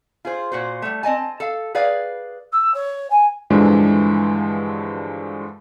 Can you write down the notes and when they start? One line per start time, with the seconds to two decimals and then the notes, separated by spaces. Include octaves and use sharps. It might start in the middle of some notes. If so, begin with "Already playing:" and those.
0.25 F4 G#4 C5
0.52 A#2 F#4 C5
0.82 G3 A3
1.03 C4 D#5 G#5 A5
1.40 A4 F5
1.75 G#4 B4 D5 F5
2.52 E6
2.74 C#5
3.10 G#5
3.50 G2 D3 E3 F3 G#3 D4